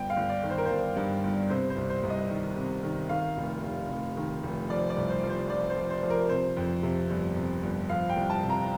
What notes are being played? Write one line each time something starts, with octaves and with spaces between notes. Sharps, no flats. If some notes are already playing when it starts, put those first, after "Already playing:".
Already playing: G1 G5
F5
G1
D5
D#3
C5
A#4
G1 C5
G2
G1
C3 C5
C5
C2
C5
C2
D#5
D#3
C3
D#3
D#3 F5
F1
F1
F1
D#3
F1
F3 D5
D5
C2
C5
F3
C5
F3 D5
C5
F3
C5
F3
A#4
C3 C5
F2
C3
G1
C3
G1
F3 F5
G5
C2
A5
C3
A#5